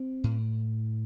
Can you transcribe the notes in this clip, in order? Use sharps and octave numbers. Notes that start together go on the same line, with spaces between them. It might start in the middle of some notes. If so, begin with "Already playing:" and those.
Already playing: C4
A2